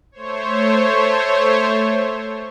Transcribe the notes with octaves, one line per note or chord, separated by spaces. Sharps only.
A3 C5 C#5